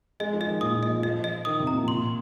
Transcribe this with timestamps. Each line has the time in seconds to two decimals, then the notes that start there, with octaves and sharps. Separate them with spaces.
0.20 G#3 D#5
0.33 F3
0.41 D#5
0.47 D#3
0.61 A#2 D#6
0.75 A#2
0.83 D#5
0.89 F3
1.03 F3 D#5
1.24 D#5
1.45 D#3 D#6
1.60 C3
1.67 A#5
1.74 A#2
1.88 A#2 C6